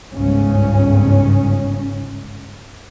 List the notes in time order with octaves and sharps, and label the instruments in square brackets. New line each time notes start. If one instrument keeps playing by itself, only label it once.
[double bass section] G1 C#2 G#2 C#3 C#4